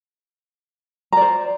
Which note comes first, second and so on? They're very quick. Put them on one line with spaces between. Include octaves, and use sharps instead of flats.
A#5 D5 C5